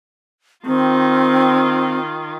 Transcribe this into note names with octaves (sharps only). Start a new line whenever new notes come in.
D#3 C4 F4